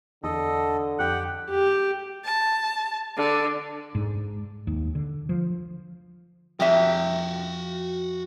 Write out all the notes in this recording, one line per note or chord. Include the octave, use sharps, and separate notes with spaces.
E2 D3 A4 D#5
F2 G4 F#5 G5
G4
A5
D3
G#2
D#2
D3
F3
F2 F#4 E5 G5